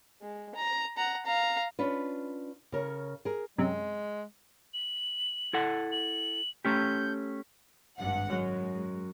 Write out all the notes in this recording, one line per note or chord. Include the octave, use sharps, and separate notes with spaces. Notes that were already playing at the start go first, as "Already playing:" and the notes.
G#3
A#5
F#5 A#5
F5 A#5
C#4 D4 F4 B4
C#3 A#4 C#5
G#4 A#4
F#2 C3 G#3
F#7
E4 A4 F#5
F#7
A3 C#4 G4 G6
G#1 G2 F#5
F#2 F#3 G#3